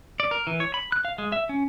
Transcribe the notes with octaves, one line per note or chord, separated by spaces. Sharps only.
D5
A#4
E3
C#5
B5
F#6
F5
G#3
E5
C#4